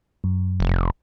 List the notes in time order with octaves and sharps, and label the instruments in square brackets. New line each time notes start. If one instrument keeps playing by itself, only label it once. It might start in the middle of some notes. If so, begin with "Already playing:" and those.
[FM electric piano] F#2
[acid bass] F1